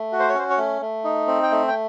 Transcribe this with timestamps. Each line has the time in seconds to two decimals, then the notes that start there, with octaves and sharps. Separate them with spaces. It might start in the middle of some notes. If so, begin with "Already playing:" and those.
Already playing: A3
0.12 F#4
0.20 C5
0.28 C#5
0.35 C#4 C5
0.50 C#5
0.58 A3
0.82 A3
1.04 D#4
1.27 C4
1.43 G5
1.51 A3
1.68 G5